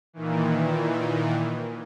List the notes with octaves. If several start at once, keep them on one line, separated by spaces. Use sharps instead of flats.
A#2 D#3 E3